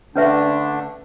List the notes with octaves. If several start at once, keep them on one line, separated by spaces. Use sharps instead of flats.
D3 A3 C#4 D4 B4 E5